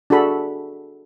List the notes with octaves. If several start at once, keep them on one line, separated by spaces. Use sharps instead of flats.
D4 F#4 G#4 A4 B5